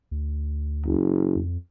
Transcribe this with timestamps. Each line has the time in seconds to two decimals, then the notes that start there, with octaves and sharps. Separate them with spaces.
0.11 D2
0.85 F#1
1.36 F2